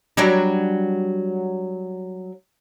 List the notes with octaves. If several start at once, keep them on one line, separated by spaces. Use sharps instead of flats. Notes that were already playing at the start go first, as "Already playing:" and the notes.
F#3 G3 D4